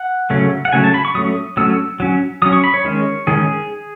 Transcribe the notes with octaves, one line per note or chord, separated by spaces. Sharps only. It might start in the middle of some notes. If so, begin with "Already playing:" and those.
Already playing: F#5
C#3 F#3 A3 C#4
F#5
C#3 F#3 A3 C#4 G#5
A5
B5
C#6
F#3 A3 C#4 D#6
F#3 A3 C#4 E6
F#3 C#4
F#3 C#4 D#6
C#6
B5
C#5
D#3 G#3 C#4
D#3 G#3 C#4 G#4